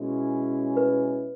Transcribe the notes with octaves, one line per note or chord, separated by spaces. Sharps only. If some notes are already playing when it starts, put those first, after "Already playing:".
Already playing: B2 G#3 C#4 E4
B4